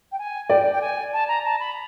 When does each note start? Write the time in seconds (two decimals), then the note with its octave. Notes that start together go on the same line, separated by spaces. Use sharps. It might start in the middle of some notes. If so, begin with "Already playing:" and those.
0.11 G5
0.18 G#5
0.49 D5 G5
0.72 G5
0.81 G#5
1.12 A5
1.28 A#5
1.44 A5
1.59 B5